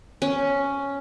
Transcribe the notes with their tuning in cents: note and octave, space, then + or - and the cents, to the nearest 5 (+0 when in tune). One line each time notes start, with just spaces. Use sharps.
C#4 +5